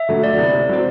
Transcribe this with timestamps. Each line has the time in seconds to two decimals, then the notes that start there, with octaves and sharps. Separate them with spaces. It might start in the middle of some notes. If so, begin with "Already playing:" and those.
Already playing: E5
0.09 D3 F#3 A3
0.24 D2 D5
0.38 C3 E3 B3
0.54 C3
0.69 F#3 C4